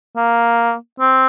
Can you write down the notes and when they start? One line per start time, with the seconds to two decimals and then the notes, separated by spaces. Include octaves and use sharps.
0.16 A#3
1.00 C4